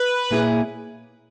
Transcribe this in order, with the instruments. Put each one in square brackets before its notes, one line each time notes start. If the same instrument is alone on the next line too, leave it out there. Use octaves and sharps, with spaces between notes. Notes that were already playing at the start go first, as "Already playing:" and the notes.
Already playing: [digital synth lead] B4
[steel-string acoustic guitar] A#2 A#3 C#4 E4 G#4